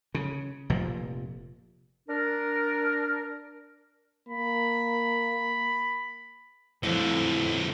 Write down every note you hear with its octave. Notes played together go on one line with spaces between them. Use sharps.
C#3
F1 A#2 F3
D4 A#4
A#3 B5
F2 D3 F3 F#3 A3 E4 E6